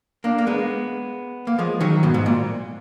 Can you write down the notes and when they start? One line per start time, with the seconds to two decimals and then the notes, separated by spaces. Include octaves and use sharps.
0.24 A#3 D4
0.39 A#3
0.47 G#3 B3
1.47 A#3
1.59 F3 G#3
1.81 D#3 F#3
2.03 G#2 B2
2.14 G#2 B2
2.26 A#2